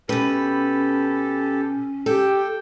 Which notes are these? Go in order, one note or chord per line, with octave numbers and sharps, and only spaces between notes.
B2 C#4 G4 A4 B4
G4 A4 G5